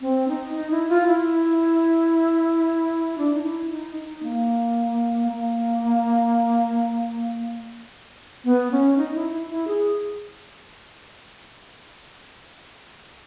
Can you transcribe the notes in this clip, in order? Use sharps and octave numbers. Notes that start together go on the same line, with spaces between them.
C4
D#4
D#4
E4
F4
E4
D4
D#4
E4
D#4
D#4
A#3
A#3
B3
C#4
D#4
E4
E4
E4
G#4